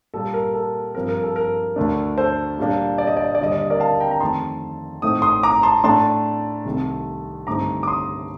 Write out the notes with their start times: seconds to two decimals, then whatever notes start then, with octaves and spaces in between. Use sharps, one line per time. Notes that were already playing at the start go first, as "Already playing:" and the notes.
0.14 A#2 G3 A#3 A4
0.34 A#4
0.54 A4
0.95 G2 F3 C4 A#4
1.09 A#4
1.23 A4
1.36 A#4
1.76 D2 D3 A3 D4
2.18 A4 C5
2.58 A#2 G3 A#3 D4
2.98 D5
3.07 D#5
3.17 D5
3.26 D#5
3.35 D5
3.40 D#2 D3 G3 D#5
3.52 D5
3.62 D#5
3.70 A#4 D5
3.80 F5 A5
4.00 G5 A#5
4.11 A#5
4.21 F2 D#3 A3 A5 C6
5.02 A2 A3 C4 D#4 D#6
5.22 C6 D#6
5.43 A#5 D6
5.63 A5 C6
5.84 A2 A3 D4 A5 C6
6.65 C2 C3 D#3 A3
7.47 G2 D3 A3 C4 D#4 A#5 D6
7.83 D6
7.88 C6 D#6